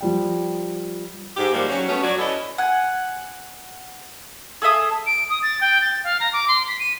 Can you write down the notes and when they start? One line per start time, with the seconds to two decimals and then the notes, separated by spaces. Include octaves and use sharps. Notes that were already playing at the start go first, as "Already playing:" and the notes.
0.01 F3 G3 G5
1.37 G#2 G4
1.53 D#3 F3 G3 G#3 A#3 F#4
1.69 F#3 C#4 F#4
1.88 G3 A3 B3 C#4
2.03 F2 F#3 F#4 D5
2.18 C#4 E4 A4 B4 C#5 D#5
2.58 F#5 G#5
4.62 G#4 A4 E5 D#6
5.07 D7
5.30 D#6
5.43 A6
5.61 G5
5.82 A6
6.04 F5
6.20 A#5
6.33 D6
6.48 C6
6.68 B6
6.79 D#7